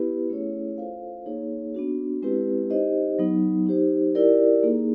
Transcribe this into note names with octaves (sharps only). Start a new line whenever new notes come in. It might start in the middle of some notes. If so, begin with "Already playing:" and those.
Already playing: B3 E4 G4 B4
A3 C#4 E4 G#4 C#5
F4 A4 C5 F5
A#3 D#4 G#4 C#5
B3 D4 F#4
G#3 C4 E4 G4 B4
D#4 G4 C5 D#5
F#3 B3 D#4
D#4 G4 C5
E4 G4 A#4 D5
A#3 D#4 G#4